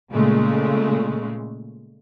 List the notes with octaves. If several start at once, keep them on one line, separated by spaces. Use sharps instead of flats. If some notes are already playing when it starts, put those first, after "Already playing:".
A#2 C#3 G#3 A3